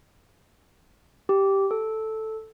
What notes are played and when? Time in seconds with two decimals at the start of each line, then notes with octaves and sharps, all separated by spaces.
1.29 G4
1.71 A4